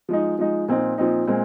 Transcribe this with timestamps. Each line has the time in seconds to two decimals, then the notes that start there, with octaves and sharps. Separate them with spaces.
0.09 F3 G#3 D#4
0.39 F3 G#3 D#4
0.68 A#2 F3 C4 D#4
0.98 A#2 F3 C4 D#4
1.27 A#2 G#3 C4